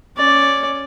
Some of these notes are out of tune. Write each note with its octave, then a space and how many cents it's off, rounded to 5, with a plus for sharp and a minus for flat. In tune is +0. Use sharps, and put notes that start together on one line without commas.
C#4 +0 D5 +0